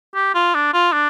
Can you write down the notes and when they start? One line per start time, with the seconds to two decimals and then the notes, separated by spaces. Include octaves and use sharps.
0.15 G4
0.35 F4
0.55 D4
0.74 F4
0.92 D4